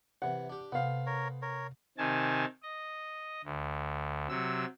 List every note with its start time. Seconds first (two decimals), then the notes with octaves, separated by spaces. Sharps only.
0.22 C3 E3 F#5
0.49 D4 G4
0.72 C3 B3 A4 C5 F5 F#5
1.06 A#4 C#5
1.42 A#4 C#5
1.98 C3 D#3 G#5 A5
2.62 D#5
3.45 D2
4.29 C3 F#3 E6